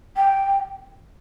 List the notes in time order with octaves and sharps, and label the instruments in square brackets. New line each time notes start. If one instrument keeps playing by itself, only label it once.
[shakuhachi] G5